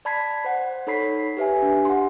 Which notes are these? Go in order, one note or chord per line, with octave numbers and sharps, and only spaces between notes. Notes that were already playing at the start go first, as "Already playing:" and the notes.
D5 A5 B5 G#6 B6 C7
C5 F#5
D#4 A4 C#5 B5 B6 C7
G4 B4 E5 G#5
D4 G4
F#5 C6